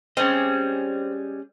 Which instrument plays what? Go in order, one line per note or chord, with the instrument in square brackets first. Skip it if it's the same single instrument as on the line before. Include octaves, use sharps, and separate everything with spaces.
[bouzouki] G3 G#3 [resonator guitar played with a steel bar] C4 [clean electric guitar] C#4 G#4 D#5